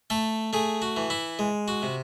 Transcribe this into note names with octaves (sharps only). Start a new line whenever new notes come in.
A3 A4
A3 G#4
F#4
E3
E4
G#3
F#4
C3